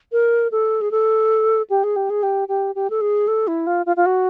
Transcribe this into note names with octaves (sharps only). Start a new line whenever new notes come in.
A#4
A4
G#4
A4
G4
G#4
G4
G#4
G4
G4
G4
A4
G#4
A4
E4
F4
F4
F4
F#4